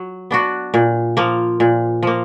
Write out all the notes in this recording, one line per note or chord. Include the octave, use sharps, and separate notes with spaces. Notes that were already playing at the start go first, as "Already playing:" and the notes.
Already playing: F#3
B3 D4 F#4
A#2
F3 A#3
A#2
F3 A#3